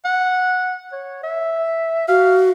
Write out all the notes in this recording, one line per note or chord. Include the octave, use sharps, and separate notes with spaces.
F#5
C#5
E5
F#4 F5